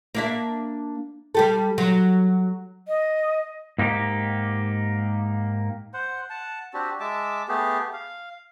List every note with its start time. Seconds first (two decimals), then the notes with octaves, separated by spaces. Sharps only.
0.15 A#3 D4 E5
1.35 G3 G4 A4
1.78 F#3
2.88 D#5
3.78 G#2 A#3 D#4 G4
5.94 C5 F#5
6.30 F#5 A5
6.74 C4 D4 F#4 G4
7.00 G#3 E5 A5 D6
7.48 A3 B3 G4 G#4
7.93 F5